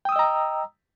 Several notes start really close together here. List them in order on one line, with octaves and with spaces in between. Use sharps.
G5 D#6 E6 D#5 A#5